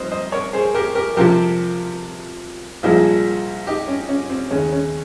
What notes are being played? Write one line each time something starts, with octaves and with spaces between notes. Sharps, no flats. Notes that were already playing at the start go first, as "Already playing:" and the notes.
Already playing: A#1 G#2 G3 C5 D#5
C5 D#5
A#4 C#5
G#4 C5
G4 A#4
G4 A#4
F2 C3 F3 G4 A#4
C2 A#2 F3 G#3
D#4 G4
C#4
C#4
C4
D#2 C#3 G#3 C#4
C#4